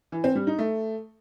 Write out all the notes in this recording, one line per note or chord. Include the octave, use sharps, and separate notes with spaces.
E3
C4
G3
D#4
A3